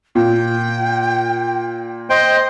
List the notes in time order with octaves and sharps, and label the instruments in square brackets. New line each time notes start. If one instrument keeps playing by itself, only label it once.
[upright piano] A#2 [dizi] G5
[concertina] C5 G5 [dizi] D#5